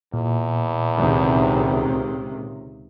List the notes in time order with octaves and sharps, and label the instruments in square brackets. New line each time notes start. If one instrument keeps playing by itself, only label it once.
[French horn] E2 [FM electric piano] A#2
[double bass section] C#2 C3 D#3